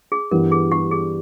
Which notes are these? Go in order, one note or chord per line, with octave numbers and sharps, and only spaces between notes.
G#4
G2 E3 G3 B3 A#4
G#4
G4
G#4